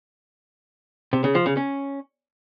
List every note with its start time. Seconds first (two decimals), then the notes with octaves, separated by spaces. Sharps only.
1.13 C3
1.24 C#3
1.35 F3
1.46 C#3
1.57 C#4